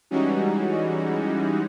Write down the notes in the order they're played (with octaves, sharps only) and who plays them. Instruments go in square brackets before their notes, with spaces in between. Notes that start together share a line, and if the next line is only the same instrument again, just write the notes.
[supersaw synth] E3 G3 G#3 C#4 D#4 F#4